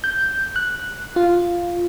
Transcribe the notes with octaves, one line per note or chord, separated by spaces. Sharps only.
G6
F#6
F4